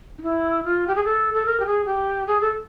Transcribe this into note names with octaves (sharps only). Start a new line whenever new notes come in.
D#4
E4
F4
G4
G#4
A4
A4
A#4
G4
G#4
G4
G#4
A4